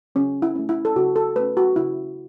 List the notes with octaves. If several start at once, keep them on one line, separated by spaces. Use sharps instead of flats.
C#3 C#4
E4
A3 C#4
E4
A4
C#3 F#4
A4
A3 C#4 B4
F#4
C#3 E4